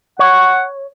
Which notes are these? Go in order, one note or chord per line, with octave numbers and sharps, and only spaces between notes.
C#5 F#5